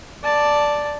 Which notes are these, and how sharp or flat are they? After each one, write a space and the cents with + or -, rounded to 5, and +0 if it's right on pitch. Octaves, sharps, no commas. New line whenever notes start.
D5 +0 A5 +0